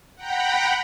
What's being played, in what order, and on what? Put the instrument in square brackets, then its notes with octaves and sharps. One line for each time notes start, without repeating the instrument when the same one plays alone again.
[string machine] F#5 G5 A#5 B5